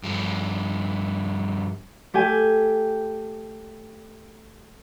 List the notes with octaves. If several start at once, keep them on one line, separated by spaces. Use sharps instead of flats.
G2 F3
A3 G4 G5 G#5